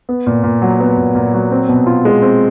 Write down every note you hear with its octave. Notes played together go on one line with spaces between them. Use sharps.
B3
A#2
A#2
F#3
B3
A#2
A#2
F#3
C4
B2
F4
G#3
C4